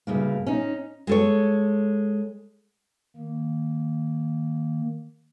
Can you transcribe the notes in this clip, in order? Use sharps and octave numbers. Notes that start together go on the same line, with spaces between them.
D2 G2 C#3 A#3
C#4 D#4
G#3 A4 C#5
D#3 A#3